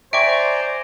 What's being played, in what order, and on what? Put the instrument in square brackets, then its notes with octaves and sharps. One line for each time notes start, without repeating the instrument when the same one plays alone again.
[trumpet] C5 [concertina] D5 G#5 A#5 [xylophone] E5 G5 C#6 [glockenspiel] D7